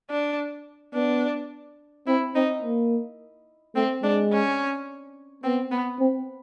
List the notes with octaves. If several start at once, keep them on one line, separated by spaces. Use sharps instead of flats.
D4
B3 D4
C4 E4
C4 D#4
A#3
A3 C4
G#3 D4
C#4
B3 C4
B3
C4